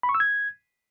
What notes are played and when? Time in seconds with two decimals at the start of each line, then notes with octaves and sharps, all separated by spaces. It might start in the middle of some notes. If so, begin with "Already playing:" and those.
0.03 B5
0.09 C#6
0.15 E6
0.20 G#6